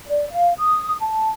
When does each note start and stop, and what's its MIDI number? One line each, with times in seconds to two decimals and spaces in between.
0.08 0.25 74
0.31 0.53 77
0.58 0.95 87
1.00 1.29 81